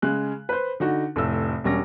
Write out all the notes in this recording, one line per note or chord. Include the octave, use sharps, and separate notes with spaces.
C#3 G#3 F#6
B4 C5
D3 D#4 F#4
F1 A2 E6
E1 G3 C#4 A#6